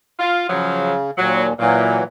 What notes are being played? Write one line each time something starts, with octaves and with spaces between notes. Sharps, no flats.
F4
C#3 F3 F#3
D#2 A#2 F#3
A#2 E3 F#3